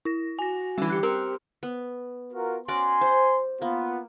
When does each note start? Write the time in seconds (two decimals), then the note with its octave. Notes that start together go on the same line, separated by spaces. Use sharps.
0.05 E4 A#6
0.39 F#4 G#5 A#6
0.78 D3 E3 G3
0.90 G4 F#6 C#7
1.03 C4 A#4
1.63 B3
2.33 F4 F#4 A#4
2.68 C#4 F#4 D5 G#5 C6
3.01 C5
3.62 A#3 B3 F4